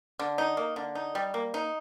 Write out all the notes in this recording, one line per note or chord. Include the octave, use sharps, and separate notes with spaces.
D3
D#4
A#3
D3
D#4
G3
A#3
D#4